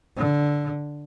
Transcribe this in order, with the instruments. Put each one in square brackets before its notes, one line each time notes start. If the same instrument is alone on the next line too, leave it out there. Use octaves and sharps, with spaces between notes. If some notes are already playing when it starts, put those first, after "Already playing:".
[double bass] D3